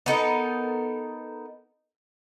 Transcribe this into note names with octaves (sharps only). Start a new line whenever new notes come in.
B3 D#4 A4 A#4